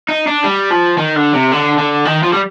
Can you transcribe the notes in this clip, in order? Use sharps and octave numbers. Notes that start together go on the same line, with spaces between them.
D#4
D4
G3
F3
D#3
D3
C3
D3
D3
D#3
F3
G3